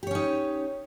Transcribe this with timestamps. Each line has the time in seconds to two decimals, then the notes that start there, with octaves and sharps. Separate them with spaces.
0.03 G4
0.07 C#5
0.11 C#4
0.15 D#4